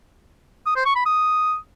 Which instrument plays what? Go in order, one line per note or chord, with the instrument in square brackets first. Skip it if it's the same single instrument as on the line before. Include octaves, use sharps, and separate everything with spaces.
[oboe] D#6
C5
C#6
B5
D#6